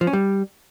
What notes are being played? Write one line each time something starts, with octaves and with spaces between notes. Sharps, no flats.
F3
C#4
G3